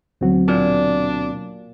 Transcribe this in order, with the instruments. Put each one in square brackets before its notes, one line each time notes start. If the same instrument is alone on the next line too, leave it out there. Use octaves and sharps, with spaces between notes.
[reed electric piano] D2 C4 F#4 [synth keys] B2 F#3
[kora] A#2 [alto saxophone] D4